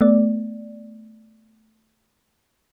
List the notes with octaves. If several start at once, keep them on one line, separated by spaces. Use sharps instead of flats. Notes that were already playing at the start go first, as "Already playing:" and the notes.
A3 B3 D5